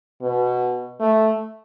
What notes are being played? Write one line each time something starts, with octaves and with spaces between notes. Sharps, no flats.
B2
A3